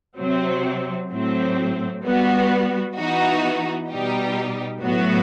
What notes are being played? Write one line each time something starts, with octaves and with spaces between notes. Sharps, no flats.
C3 F#3 C4
A2 F#3 C4
G3 B3 F#4
E3 B3 D#4 F#4
B2 G3 D#4 G4
A2 F#3 B3 F#4